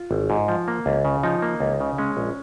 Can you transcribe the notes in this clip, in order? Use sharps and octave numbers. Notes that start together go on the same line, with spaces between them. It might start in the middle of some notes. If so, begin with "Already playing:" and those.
Already playing: F4
G#1
G#2
F3
A#3
C#2
C#3
F3 D#4
A#3
C#2
C#3
G#3 C#4
A#1